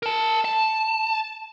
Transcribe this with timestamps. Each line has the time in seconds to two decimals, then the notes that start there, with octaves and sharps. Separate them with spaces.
0.03 A#4 A5
0.45 A5